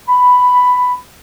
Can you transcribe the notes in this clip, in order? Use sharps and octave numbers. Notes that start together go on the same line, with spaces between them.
B5